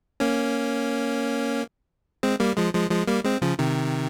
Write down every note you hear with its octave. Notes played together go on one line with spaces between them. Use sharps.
A#3 C#4
G#3 C4
G3 A#3
F3 G#3
F3 G#3
F3 G#3
G3 A#3
G#3 C4
C#3 F3
C3 D#3